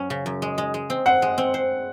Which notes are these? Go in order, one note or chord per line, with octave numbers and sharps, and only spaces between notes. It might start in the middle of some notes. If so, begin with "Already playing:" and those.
Already playing: F#2 F#3 C#4
C#3
F#2
G#3
G#3
G#3
C4
C5 F#5
G#3
C4
C5